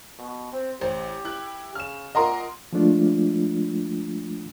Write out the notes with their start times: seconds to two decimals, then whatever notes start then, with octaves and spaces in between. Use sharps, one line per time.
0.18 B2
0.53 C4
0.81 A1 G4 C5
1.25 E4 F#6
1.75 C#3 F6 E7
2.15 A#2 F4 A#4 D#5 F#5 A#5 C6
2.73 F3 G#3 A3 D4 F4